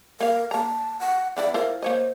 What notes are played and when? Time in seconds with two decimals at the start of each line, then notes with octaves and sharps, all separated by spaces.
0.20 A#3 A#4 F5
0.51 A#3 A5 A#5
1.00 F#5
1.37 E3 B3 E4 D5
1.54 E4 F4 A#4 C5
1.82 A#3 C5 C#5 D#5